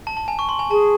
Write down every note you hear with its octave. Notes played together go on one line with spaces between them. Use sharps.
A5
A5
G#5
C#6
C6
G#5
G#4 A5